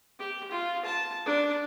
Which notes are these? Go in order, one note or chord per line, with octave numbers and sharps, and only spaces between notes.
G4
F4
A5
D4